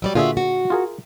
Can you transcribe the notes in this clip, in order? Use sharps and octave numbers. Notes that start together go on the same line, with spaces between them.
F#3 G3 D5
A#2 D3 F4 F#4 G#4 E5
F#4
F4 G#4 A#4